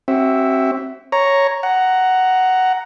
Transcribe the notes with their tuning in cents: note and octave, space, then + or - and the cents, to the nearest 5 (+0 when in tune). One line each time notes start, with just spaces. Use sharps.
C4 +30 F#4 +40 E5 +0
C#5 +0 A#5 +0 C#6 +0
F#5 +10 A#5 +0